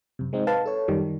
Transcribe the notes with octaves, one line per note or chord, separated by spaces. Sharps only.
F#2 C3
G#3 C4 D#4
B4 F5 A5
A4 C#5
F#2 D#3 G3